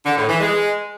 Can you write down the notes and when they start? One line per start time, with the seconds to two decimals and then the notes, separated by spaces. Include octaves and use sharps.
0.06 D3
0.17 A2
0.28 E3
0.40 G#3